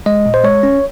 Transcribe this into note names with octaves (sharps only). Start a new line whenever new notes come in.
G#3 D#5
A#2
C5
G#3 C#5
C#4